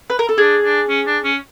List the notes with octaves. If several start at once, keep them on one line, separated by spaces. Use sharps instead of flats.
B4
A#4
A4
D4 G#4
D4
C#4
D4
C#4